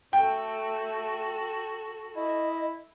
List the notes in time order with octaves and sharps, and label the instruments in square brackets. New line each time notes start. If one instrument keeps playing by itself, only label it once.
[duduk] A3 [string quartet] F#4 A4 [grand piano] G5
[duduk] E4 [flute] D#5